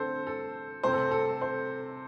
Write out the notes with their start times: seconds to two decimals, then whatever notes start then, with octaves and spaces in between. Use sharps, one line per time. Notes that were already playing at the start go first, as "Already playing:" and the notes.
Already playing: D3 A3 C4 A4 C5
0.27 A4
0.83 C3 A3 C4 C5
0.93 A4
1.11 A4
1.42 C5